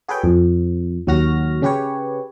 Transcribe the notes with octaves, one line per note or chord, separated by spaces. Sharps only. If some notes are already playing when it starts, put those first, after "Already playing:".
F#4 G#4 A4 B4 C#5 G5
F2
D#2 F#3 F#4 F6 A#6
C#3 C#4 G4 B4 C#5